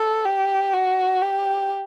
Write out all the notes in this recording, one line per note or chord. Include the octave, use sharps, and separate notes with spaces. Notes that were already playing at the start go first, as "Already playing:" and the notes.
Already playing: A4
G4
F#4
G4